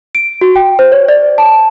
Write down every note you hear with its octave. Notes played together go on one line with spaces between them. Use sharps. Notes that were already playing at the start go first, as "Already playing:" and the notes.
D7
F#4
G5
C5
C#5
D5
A5